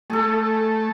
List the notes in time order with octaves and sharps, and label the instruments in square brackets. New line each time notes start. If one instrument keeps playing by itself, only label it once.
[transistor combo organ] A3 [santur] G#4 A4